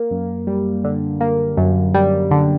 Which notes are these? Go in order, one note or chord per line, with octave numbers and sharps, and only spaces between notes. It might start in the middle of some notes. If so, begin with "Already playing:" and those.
Already playing: A#3
F#2
G3
D3
A#3
F#2
G3
D3